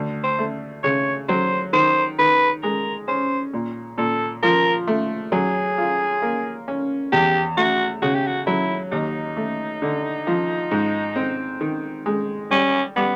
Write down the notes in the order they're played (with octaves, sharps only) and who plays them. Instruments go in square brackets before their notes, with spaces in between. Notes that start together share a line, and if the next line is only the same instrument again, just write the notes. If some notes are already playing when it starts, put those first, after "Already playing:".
Already playing: [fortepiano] D2
[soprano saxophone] C5
[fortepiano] A3
[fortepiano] C#3 [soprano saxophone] C#5
[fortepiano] F#3 [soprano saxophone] C5
[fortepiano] D#3 [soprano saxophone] C5
[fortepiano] D#3 [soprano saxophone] B4
[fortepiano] G#3 [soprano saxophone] A#4
[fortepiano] C#4 [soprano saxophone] C5
[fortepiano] A#2
[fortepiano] A#2 [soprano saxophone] A4
[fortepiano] F3 [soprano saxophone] A#4
[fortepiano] A3
[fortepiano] F#3 [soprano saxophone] G#4
[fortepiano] F4
A#3
C#4
[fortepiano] E2 [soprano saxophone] G4
[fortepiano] A3 [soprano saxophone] F#4
[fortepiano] C#3 [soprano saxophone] F#4
[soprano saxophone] G4
F#4
[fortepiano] F#3 [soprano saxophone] E4
[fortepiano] D#2 [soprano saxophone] D#4
[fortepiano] A3
D3
F3
G#2
C4
D#3
G#3
[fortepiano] G3 [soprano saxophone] C#4
[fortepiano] G3 [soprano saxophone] B3